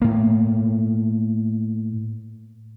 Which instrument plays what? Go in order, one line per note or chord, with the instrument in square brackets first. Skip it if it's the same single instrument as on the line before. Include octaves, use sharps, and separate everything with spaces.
[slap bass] A2 A#3